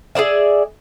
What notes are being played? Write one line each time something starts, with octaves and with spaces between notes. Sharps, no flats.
G#4 A#4 D5 E5